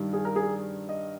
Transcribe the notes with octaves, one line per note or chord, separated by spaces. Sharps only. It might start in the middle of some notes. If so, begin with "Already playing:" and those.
Already playing: G2 D#3 G3
G#4
A#4
G#4
D#5